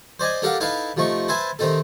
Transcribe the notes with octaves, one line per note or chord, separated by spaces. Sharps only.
C5 D5 D#5 G#5
D4 G4 A4 A#4 F5 F#5
D#4 E4 A4 B4 E5 F5
C3 F3 A3 D#4 C#6
B4 C5 E5 G#5 A5
C3 D#3 C4 D#4 A4